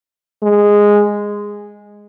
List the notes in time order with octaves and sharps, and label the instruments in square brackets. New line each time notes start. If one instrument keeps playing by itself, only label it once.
[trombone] G#3